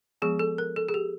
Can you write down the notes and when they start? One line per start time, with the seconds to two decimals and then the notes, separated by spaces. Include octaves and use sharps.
0.22 F3 G#3 B3 G#4
0.39 A4
0.58 A#4
0.76 A4
0.89 G#4
0.94 G4